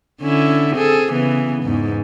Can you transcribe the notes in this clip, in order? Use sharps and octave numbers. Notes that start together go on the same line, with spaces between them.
D3 C#4 E4
C4 G#4 A4
C#3 E3 B3
E2 G#2